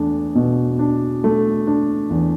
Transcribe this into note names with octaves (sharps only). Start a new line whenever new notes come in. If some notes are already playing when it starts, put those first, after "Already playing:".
Already playing: E2 A3 D4
B2
D4
A3
D4
E2